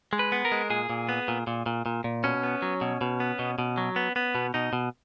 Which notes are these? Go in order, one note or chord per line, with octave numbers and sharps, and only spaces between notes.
G#3
B4
B3
A#4
G#3
A#2 G#4
A#2
B3
A#2
A#2
A#2
A#2
A#2
B2 C#4
B3
F#3
B2
B2
B3
B2
B2
F#3
B3
B3
B2
B2 D#4
B2